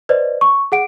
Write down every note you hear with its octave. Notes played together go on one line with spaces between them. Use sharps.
B4 C5 D5 D#5
C#6
G#4 F#5 D7